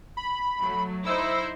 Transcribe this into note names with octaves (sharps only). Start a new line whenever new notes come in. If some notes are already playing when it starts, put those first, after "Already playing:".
B5
F#3 A3
D#4 E4 C5 E6